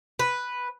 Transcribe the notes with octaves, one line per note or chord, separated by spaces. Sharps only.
B4